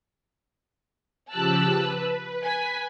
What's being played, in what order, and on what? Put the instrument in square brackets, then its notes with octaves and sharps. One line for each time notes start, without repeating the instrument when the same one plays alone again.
[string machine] C#3 F3 G4 [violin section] A5 E6 F#6
[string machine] B4
[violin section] G#5 B6